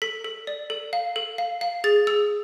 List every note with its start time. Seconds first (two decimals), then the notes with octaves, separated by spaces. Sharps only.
0.02 A4 B6
0.24 A4
0.47 D5
0.70 A4
0.93 F5
1.16 A4
1.38 F5
1.61 F5
1.84 G#4 A6
2.07 G#4 E6